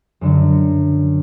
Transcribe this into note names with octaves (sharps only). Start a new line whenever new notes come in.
F#2 D3 F#3